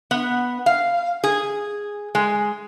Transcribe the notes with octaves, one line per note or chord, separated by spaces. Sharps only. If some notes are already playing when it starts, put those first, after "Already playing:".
B3
F5
G#4
G#3